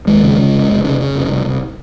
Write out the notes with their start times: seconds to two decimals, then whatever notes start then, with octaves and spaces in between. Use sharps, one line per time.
0.07 D#2 G#3
0.23 C#3
0.38 C#3
0.54 F1
0.69 F1
0.85 C#3
1.00 C#3
1.15 F1
1.30 C2
1.46 C2